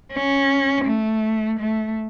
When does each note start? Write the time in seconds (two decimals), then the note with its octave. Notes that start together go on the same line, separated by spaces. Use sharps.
0.13 C#4
0.85 A3
1.59 A3